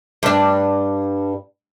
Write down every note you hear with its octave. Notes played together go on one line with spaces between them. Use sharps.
G2 D4